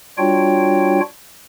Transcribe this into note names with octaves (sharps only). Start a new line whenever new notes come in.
G3 D4 F4 F#4 C#5 G5